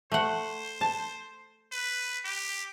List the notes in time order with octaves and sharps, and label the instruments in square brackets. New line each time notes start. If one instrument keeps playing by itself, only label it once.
[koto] A3 F#5 [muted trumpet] C5
[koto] A5
[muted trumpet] B4
G4